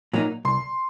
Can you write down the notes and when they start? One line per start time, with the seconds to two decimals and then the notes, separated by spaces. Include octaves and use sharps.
0.13 A#2 F#3 A#3 D#4
0.45 C2 C6